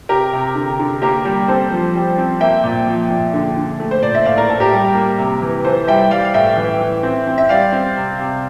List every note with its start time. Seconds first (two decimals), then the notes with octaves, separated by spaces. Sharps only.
0.09 C3 G4 A#4
0.33 C3
0.55 D3
0.80 D3
1.02 A#3 G4 A#4
1.25 G3
1.48 C4 A4 C5
1.71 F3
1.95 G3
2.18 C4
2.41 A#3 E5 G5
2.64 A#2
2.87 F3
3.10 A#2
3.34 D3
3.57 D3
3.80 A3
3.91 C5
4.03 A#2 D5
4.15 E5
4.25 A2 D5 F5
4.38 A#4 D5
4.49 A2 A4
4.60 G4 A#4
4.73 G3
4.95 A#3
5.19 C3
5.42 E3
5.65 E3 A4 C5
5.88 G3 E5 G5
6.11 G3 D5 F5
6.25 F5
6.34 A2 E5 G5
6.57 E3
6.80 E3
7.03 C4
7.27 C4
7.38 E5
7.49 G3 D5 F5
7.72 C4
7.97 C3
8.20 C3